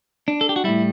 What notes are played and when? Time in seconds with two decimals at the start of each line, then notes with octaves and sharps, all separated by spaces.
0.28 D4
0.41 A4
0.49 G4
0.56 F#4
0.64 A2 G3 E4